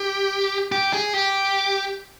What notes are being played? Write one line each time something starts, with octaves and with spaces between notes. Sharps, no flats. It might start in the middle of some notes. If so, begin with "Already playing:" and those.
Already playing: G4
G4
G#4
G4